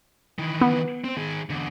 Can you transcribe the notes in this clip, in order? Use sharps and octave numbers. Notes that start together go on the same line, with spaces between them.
D#3 E3
B3
C4 C5
D#3 G#4
E2 D3